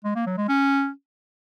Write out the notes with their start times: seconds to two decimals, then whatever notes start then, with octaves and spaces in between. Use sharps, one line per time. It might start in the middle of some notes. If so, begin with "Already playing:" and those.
0.04 G#3
0.15 A#3
0.27 F#3
0.38 G#3
0.49 C#4